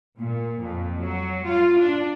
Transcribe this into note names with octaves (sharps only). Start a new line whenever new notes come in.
A#2
F2
F#3
F4
D4